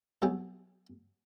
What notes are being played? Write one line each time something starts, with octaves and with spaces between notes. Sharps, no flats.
C2 B2 F#3 E4 G#4 G5